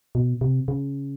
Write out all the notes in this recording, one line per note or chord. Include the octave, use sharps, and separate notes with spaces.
B2
C3
C#3